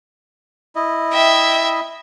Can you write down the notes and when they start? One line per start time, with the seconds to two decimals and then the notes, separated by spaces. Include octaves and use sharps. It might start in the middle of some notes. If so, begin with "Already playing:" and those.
0.76 E4 D#5
1.12 E5 G5